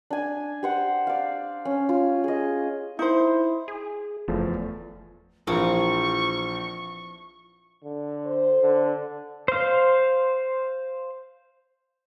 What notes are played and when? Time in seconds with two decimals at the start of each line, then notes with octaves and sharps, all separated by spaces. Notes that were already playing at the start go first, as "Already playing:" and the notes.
0.10 D4 G#5
0.63 G4 C5 F#5
1.07 D5 F5
1.65 C#4
1.89 F4
2.24 G#4 D#5
2.99 D#4 E4 C5
3.68 G#4
4.28 F#1 E2 F3 A3
5.47 A#1 E3 F3 C4 A#4 C#6
7.84 D3
8.26 C5
8.61 D3
9.48 C5 F5